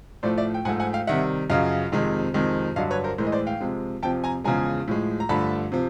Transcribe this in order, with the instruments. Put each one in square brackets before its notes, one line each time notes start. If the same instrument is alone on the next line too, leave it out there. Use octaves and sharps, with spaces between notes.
[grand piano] A2 F3 A3 C5 D5
D5 E5
G5
G#2 F3 A3 F#5 G#5
F#5 G#5
F5 G5
C3 D#3 G3 E5 F#5
F#2 C#3 F3 D#5 F5
F2 C3 D#3 G#3
F2 C3 D#3 G#3
G2 D3 F#3 D#5 F5
B4 C#5
A#4 C5
A2 E3 G#3 A#4 C5
D#5
C5 D5
F5 G5
C3 F3 G#3
F2 C3 F3 G5 A5
G#5 A#5
E2 C#3 F3 G#3 G#5 A#5
A2 F3 G#3
A#5
G2 D3 F3 A3 A5 B5
C3 F3